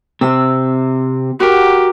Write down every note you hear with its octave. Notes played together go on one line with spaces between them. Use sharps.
C3 C4 E6
F#4 G4 A#4